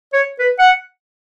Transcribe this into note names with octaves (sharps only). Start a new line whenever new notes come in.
C#5
B4
F#5